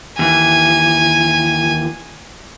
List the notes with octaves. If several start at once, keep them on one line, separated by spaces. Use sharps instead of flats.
D#2 E3 G#5